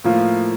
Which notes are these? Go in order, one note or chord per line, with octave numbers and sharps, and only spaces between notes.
A2 F3 A#3 F4